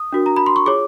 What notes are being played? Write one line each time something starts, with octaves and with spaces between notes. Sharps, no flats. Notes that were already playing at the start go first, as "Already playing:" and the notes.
Already playing: D#6
D4 F#4 A#4
A#5
B5
C6
C#6
F4 G#4 C#5 D6